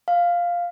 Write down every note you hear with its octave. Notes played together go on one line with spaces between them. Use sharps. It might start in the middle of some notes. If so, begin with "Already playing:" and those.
F5